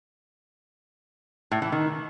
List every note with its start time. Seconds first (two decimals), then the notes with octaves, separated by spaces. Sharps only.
1.51 A2
1.62 E3
1.72 D#3